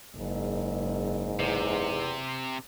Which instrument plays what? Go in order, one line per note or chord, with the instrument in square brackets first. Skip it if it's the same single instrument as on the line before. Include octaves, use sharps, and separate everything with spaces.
[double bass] F#1 [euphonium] G#2
[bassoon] E2 [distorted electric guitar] C3